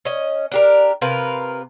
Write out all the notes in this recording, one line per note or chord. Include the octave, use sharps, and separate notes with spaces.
C#4 D#5
D4 G4 A#4
C3 F4 A#4 B4